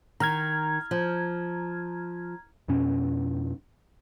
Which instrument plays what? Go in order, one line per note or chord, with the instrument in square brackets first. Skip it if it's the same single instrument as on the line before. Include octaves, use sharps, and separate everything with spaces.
[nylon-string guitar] D#3 [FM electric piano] A#5 F6 G#6
[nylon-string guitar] F3
[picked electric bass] F2 B2 C#4